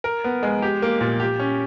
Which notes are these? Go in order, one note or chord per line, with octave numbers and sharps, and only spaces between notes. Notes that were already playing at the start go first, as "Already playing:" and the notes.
A#4
B3
G#3
G4
A#3
A#2
G4
C#4